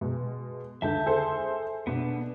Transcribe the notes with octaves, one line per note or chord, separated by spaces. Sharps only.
B2 G#3
C#2 D3 E5 A5 G6
G#4 A4 C5
B2 B3 D4